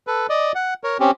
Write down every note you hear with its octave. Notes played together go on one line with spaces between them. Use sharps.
A4 B4
D5 D#5
F#5
A#4 C#5
C4 C#4 G4